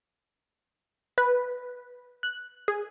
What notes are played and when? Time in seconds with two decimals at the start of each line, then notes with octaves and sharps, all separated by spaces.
1.18 B4
2.23 F#6
2.68 G#4